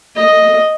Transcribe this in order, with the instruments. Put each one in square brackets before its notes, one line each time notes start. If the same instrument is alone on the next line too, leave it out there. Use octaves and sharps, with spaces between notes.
[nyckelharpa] D#5